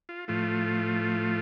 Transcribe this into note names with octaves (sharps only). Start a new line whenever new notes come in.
F4
A2 F3 A3 F4